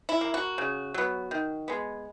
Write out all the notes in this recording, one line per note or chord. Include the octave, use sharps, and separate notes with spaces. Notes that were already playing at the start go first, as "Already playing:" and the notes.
E4
A#3
F#4
C#3
F#3 B3
D#3
G#3 B3